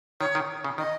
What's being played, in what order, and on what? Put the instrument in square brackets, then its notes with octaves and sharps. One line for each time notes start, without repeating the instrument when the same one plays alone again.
[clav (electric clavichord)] D#3 [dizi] C#5
[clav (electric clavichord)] D#3
C#3
[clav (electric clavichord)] D#3 [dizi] D#5